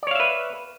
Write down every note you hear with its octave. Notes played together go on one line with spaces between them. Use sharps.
B4 C#5 D5 E5 F5